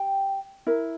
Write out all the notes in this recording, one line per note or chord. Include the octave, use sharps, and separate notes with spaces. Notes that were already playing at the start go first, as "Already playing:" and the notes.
Already playing: G4 G5
E4 A#4